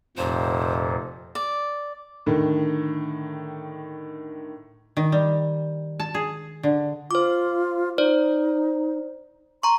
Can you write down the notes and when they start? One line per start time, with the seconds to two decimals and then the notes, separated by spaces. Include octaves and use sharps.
0.17 F1 F2 A#2 C5
1.35 D5
2.26 A2 D3 D#3
4.97 D#3
5.12 G3
6.00 A5
6.14 G#4
6.63 D3
7.11 F4 C5 D6
7.98 D#4 C5 D5
9.63 A#5 C6 C#6